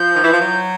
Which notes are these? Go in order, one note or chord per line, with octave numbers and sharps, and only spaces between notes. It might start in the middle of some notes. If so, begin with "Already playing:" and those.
Already playing: F3 G6
D#3
E3
F3
F#3